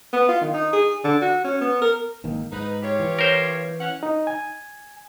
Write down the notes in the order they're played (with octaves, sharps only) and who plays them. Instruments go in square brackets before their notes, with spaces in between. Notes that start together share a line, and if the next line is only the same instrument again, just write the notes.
[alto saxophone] B3
F4
D#3
D#4
G#4
D3
F#4
C#4
B3
A#4
[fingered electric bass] G#1 D#3 A#3
[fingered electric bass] G#2 [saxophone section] D#4 B4
[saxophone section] F4 G4 C#5
[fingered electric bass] E3
[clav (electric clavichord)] A#4 C5
[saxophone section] C#4 F#5
[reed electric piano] D#4
G#5